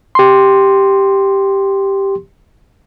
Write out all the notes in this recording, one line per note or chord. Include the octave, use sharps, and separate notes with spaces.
G4 C6